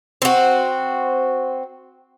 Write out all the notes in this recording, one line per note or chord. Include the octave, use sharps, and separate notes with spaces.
C4 F#4